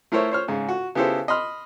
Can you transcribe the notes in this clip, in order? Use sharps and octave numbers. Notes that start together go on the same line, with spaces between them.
A3 E4 A#4 C5 C#5 E5
C5 C#5 F6
G#2 C#3
F#4
C#3 B3 E4 G4 A4 C5
D#5 B5 C6 F6